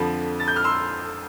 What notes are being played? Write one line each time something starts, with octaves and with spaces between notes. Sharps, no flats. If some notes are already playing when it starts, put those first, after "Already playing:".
Already playing: F2 D3 F3 B5
A6
G6
F6
C6 E6